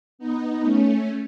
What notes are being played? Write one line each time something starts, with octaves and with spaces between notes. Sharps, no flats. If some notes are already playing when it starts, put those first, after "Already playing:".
B3 D#4
A3 C#4